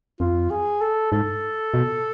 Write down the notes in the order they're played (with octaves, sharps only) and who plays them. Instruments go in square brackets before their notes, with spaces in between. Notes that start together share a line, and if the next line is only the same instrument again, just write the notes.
[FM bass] F2 [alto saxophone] F4
[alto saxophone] G#4
A4
[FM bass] G#2 [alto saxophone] A4
[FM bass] B2